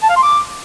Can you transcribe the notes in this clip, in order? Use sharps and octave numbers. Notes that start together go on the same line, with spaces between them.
A5
F5
C6
D6